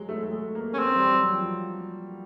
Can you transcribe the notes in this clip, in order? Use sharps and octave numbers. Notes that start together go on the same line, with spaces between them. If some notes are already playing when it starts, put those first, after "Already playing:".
Already playing: F#3 G#3
A3
A3
G#3
A#3
C#4
B3 C4
G3
F#3
F3